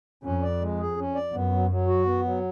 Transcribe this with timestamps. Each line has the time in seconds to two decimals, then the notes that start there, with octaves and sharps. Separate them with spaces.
0.24 F2 C#4
0.42 D5
0.61 G#3
0.79 G#4
0.97 C#4
1.15 D5
1.33 F#2 B3
1.52 F#3
1.69 F#3
1.87 F#4
2.06 B3
2.24 F#3